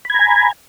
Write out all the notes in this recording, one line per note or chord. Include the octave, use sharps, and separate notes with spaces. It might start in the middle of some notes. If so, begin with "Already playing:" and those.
G#5 A#5 B5 G#6